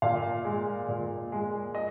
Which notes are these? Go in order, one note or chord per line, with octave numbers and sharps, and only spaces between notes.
A#2 F5
G#3
A#2
G#3
D#5